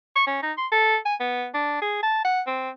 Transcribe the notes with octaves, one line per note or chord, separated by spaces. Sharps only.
C#6
C#4
D#4
C6
A4
G#5
B3
D4
G#4
A5
F#5
C4